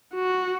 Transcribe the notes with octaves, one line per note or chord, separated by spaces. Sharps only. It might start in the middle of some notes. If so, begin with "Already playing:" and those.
F#4